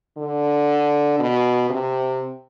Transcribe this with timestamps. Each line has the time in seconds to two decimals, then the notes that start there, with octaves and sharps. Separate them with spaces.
0.18 D3
1.19 B2
1.70 C3